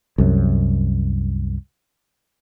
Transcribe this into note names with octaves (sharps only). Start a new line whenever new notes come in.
C2 F#2